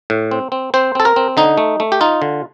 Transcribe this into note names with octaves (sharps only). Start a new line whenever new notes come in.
A2
C4
C4
C4 C5
C4 A4
A#4
C4
D3 D#4
A3
A3
G4
D#4 F4
D3